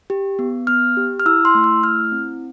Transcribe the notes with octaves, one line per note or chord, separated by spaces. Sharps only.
G4
B3
B3 F6
G4
F6
E4 E6
C6
A3
E6
E4 F6
C4